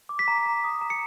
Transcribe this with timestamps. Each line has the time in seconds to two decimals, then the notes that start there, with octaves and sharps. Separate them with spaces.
0.09 D6
0.19 B6
0.28 A#5
0.46 A#5
0.64 D#6
0.81 A#5
0.90 C#7